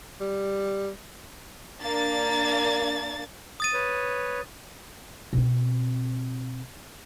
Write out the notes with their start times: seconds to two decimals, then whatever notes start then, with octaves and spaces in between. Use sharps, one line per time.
0.21 G3
1.80 A#3 D4 A6
3.60 D#6 A6 D#7
3.73 B4 C#5
5.33 B2 C4